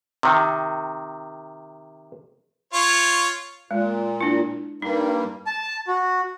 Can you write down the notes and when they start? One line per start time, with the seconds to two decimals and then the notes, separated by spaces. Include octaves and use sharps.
0.23 C3 D#3
2.73 F4 C#5
3.71 A#2 G#3
4.21 D4 E4
4.82 G2 G3 A#3 D#4
5.47 A5
5.88 F#4